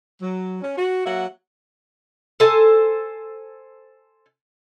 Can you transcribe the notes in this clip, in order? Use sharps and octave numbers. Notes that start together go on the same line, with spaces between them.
F#3
C#4
F#4
F#3 A#3 F#4 E5 F#5
A4 C5 G#5 A5